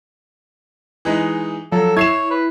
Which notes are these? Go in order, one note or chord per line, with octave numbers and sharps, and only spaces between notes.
E3 G#3 D#4
F3 F#3 A4
E4 C#5 G#6 C7 E7
B4